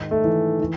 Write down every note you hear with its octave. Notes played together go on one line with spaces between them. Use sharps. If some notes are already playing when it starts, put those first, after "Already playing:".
Already playing: G#2 D#3
A3
E3
E3